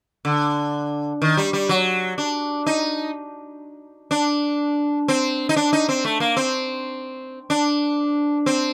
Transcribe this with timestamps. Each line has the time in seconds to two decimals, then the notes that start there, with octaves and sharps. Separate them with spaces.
0.25 D3
1.22 D#3
1.37 G3
1.53 G3
1.69 F#3
2.18 D4
2.66 D#4
4.11 D4
5.08 C4
5.49 D#4
5.56 D4
5.73 D#4
5.89 C4
6.05 A3
6.20 A#3
6.37 C4
7.50 D4
8.46 C4